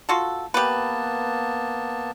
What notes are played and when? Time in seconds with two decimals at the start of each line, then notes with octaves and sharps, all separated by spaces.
0.09 F4 F#4 A4
0.54 A#3 B3 G4 B4 A5